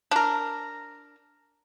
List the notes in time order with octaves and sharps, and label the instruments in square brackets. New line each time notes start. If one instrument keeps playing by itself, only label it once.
[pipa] D4 A#4